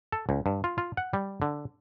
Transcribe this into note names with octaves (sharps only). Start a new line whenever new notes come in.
A4
C#2
G2
F4
F4
F#5
G3
D3